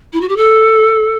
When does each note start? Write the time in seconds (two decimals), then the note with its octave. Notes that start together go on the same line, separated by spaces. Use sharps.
0.13 E4
0.21 F#4
0.28 G4
0.37 A4